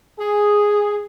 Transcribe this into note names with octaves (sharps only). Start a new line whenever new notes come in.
G#4